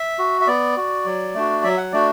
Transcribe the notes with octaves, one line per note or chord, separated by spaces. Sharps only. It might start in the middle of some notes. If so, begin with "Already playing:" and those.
Already playing: E5
F#4
E5
B3 D5
F#4
F#3
A3 D4 F#4
F#3 E5
F#5
A3 D4 F#4 D5